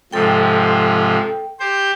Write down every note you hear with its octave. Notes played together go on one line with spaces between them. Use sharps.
G#2 C3 F3 A4 G5
G4 C5 G6